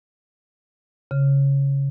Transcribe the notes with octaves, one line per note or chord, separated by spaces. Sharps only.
C#3